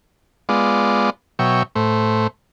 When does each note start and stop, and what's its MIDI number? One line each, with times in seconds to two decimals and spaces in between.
0.49 1.10 56
0.49 1.10 59
0.49 1.10 65
0.49 1.10 74
1.39 1.63 47
1.39 1.63 54
1.39 1.63 73
1.39 1.63 76
1.39 1.63 79
1.75 2.27 45
1.75 2.27 57
1.75 2.27 72